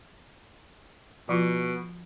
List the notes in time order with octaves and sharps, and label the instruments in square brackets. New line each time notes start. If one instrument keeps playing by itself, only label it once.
[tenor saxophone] B2 [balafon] F3 F4